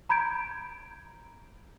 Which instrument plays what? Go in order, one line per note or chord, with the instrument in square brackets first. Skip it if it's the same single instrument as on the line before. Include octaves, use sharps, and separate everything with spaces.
[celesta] A#5 B5 G6 G#6 D7